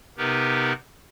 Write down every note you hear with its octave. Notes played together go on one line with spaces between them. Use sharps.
C3 B3 D#4 G4 A#4 B4